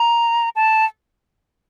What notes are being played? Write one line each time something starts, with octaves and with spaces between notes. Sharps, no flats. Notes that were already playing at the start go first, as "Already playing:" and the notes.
Already playing: A#5
A5